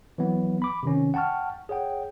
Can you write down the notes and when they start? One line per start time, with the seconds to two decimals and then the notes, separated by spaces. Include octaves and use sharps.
0.18 E3 F#3 B3
0.62 B5 D6
0.83 C3 D#3 C#4
1.14 F#5 G5 A5 C#6 F6
1.69 G#4 C#5 F#5 G5